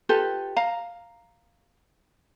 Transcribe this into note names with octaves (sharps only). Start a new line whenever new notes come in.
F4 G4 A4 B4
F5 A#5